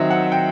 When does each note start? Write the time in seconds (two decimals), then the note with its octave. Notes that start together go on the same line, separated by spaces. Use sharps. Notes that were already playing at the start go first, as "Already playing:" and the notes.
Already playing: D#3 F#3 C4 D#5 E5
0.11 F#5
0.32 G5